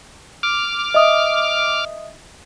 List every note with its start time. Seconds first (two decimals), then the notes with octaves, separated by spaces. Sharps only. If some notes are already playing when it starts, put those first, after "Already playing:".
0.43 D6 F6
0.94 D#5 E5 D#6